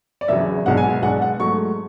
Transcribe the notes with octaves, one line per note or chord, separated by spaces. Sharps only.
D5
E1 E2 C#3 F#3 E5
B1 B2 G#3 D4 F#5
G#5
G#5
B1 B2 G#3 D4 F#5
F#5
G#2 F#3 A3 C#6